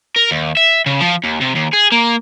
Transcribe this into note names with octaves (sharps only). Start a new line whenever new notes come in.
A#4
D#2
E5
C#3
F3
D#2
C3
D#2
G#4
A#3